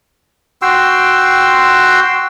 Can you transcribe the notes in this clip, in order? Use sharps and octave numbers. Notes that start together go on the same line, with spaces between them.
F#4 G5 C6 E6